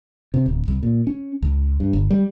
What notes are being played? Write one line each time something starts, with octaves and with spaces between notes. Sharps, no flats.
C3
D1
C2
A#2
C#4
C#2
G2
G1
G3